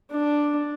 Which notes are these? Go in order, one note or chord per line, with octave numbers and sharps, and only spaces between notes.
D4